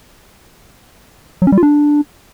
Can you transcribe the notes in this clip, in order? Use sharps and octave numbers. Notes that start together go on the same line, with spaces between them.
F#3
C#4
G3
F4
D4